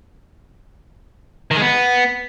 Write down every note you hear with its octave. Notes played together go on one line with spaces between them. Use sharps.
D#3
G#3
B3